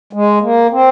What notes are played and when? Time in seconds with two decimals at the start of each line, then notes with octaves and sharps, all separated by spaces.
0.13 G#3
0.41 A#3
0.71 C4